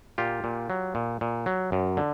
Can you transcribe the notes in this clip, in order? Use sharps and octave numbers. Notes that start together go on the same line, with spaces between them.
A#2 F4 G4
A#2
F#3
A#2
A#2
F#3
F#2
D3